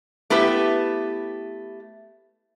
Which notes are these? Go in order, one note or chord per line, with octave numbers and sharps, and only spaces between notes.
A3 B3 E4 G4 B4